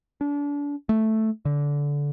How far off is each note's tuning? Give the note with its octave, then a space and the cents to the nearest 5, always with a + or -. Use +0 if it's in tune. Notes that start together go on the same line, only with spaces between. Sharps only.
D4 -30
A3 +0
D3 -20